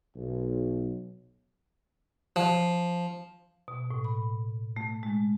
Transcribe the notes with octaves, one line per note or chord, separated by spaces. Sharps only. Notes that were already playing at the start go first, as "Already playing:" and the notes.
B1
F3
B2
A2
B5
A3
G#3